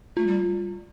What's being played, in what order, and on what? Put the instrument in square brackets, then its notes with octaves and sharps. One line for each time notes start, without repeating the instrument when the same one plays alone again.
[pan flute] A3 [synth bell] F4
[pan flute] G3